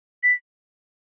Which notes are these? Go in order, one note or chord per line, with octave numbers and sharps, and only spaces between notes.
B6